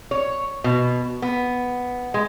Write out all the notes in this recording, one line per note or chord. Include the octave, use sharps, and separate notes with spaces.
C#5
B2
B3
G#3